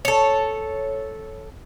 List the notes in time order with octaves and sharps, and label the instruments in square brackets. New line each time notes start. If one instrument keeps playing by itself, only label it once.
[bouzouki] A4 C#5